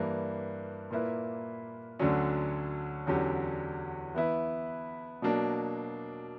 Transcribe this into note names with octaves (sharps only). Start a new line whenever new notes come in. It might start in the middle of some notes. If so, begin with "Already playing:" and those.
Already playing: G2 E3 A#3
A#2 A#3 E4 B4
D2 D3 F#3 C#4
E2 D3 F#3 C#4 G4
E3 B3 E4 B4
B2 F#3 A#3 D4